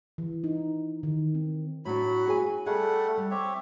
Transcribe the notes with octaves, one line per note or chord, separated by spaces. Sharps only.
E3
D#4
D#3
C4
A2 F#3 D4 F#4 B5
G#4 G#5
G3 A3 G#4 A4 F#5
G3
C4 C#5 E5 D6